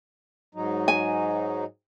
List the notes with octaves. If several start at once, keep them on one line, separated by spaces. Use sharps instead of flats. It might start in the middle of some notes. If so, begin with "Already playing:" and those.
G#2 F#3 D#4
G#5